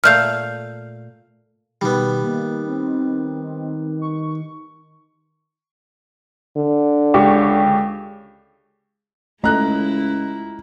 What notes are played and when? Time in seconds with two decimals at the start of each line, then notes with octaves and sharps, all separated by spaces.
0.04 A#2 A3 F5 F6 G6
1.81 B2 D#3 G3 B3
2.24 A#3
2.68 C4
4.01 C#6
6.56 D3
7.14 C#2 G4 C#6
9.44 C#2 G#3 A3 E4 A4 D#5 A#5 F#6